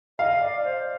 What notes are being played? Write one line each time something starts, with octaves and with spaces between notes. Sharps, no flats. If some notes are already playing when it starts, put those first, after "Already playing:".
D#5 F5
D5
C5